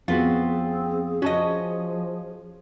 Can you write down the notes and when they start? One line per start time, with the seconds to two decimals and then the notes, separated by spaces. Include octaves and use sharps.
0.08 F2 B3 C4 F4 F#4 G#4
1.22 F3 C#4 F#4 D#5 A5